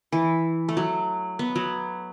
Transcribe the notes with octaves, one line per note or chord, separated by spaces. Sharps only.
E3
A3
F#3
B3
F#3